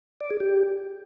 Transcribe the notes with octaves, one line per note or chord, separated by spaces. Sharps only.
D5
G#4
G4